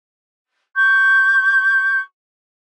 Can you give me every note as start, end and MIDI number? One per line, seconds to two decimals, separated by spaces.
0.75 2.01 85
0.75 2.01 91